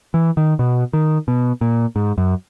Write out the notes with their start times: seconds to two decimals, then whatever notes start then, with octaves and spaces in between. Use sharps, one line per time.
0.14 E3
0.37 D#3
0.59 B2
0.93 D#3
1.28 B2
1.61 A#2
1.96 G#2
2.18 F#2